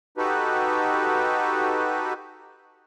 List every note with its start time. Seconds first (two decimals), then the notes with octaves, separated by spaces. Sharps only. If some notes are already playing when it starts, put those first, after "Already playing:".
0.18 D#4 F#4 G4 A4 B4